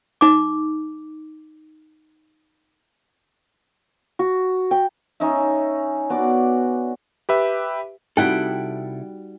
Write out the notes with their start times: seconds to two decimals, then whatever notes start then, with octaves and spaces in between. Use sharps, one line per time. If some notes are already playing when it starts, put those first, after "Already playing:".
0.21 D#4 D6
4.19 F#4
4.71 G5
5.20 C#4 D#4 D#5 E5
6.10 B3 F#4 D5 D6
7.29 G4 B4 E5
8.17 C3 G3 D#4 E4 F#4 A4 F#5 G5